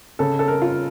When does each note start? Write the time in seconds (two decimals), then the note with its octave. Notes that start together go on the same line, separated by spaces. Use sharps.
0.19 C#3 A4
0.39 A4
0.48 A#4
0.62 F4